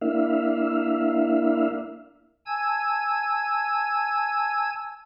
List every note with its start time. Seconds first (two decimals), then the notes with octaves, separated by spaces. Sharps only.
0.01 A#3 D4 E4 E5 F5
2.46 G#5 A5 E6 G#6